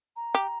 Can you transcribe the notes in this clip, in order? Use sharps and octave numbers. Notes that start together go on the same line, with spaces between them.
A#5
G4